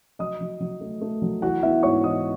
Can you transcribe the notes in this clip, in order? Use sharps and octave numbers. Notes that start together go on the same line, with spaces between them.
F#3 D#5 D#6
F#3
F#3
A3
A3
F#3
E3 F#4 F#5
B3 E4 E5
G#2 C#5 C#6
E3 D#5 D#6